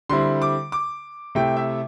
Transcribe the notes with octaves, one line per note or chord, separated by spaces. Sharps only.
D3 G3 C4 E4 C6
D6
D6
C3 A3 E4 G5
E5